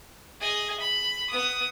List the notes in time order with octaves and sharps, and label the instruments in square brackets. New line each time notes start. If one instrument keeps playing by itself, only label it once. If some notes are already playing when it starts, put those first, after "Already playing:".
[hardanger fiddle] G#4 D#5
B5
B3 D#6